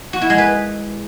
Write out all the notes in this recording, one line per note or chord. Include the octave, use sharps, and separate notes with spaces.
F#4
E4
G#3
B4